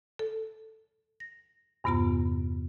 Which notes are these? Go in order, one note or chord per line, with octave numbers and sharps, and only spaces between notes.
A4
A#6
E2 G2 C3 B3 F4 A#5